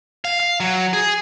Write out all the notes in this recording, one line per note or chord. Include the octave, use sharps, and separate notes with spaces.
F5
F5
F#3
G#4